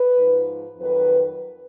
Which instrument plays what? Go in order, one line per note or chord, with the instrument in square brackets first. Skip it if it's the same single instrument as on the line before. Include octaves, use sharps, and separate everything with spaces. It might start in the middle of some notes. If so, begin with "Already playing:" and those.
Already playing: [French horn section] B4
G#2 F3
F2 D#3 F#3 B4